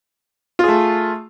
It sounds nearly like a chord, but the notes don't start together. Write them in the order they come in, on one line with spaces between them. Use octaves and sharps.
F4 G#4 A3